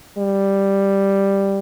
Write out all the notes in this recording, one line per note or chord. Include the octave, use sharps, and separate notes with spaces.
G3